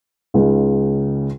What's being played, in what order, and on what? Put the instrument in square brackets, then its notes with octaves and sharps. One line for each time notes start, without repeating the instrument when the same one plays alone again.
[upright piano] C#2 C#3 G#3 D#4 G#4